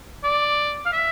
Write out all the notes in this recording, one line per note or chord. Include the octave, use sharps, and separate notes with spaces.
D5
F5
E5